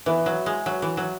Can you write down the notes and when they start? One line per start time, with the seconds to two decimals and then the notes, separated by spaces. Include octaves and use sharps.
0.06 E3 B3 E4 B4
0.26 F#3
0.46 G#3
0.66 F#3
0.82 E3
0.97 F#3